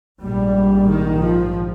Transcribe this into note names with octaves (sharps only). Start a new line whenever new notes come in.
A#1 G#2 G3
D#3
F3